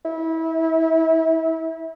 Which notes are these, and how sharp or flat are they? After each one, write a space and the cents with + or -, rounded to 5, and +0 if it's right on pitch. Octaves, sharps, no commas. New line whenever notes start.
E4 -30